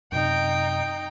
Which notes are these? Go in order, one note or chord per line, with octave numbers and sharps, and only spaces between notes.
F#2 C3 D#4 G5